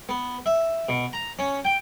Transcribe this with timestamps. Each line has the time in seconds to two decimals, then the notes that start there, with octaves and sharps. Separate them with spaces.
0.09 B3
0.46 E5
0.89 B2
1.13 A#5
1.39 C#4
1.65 G5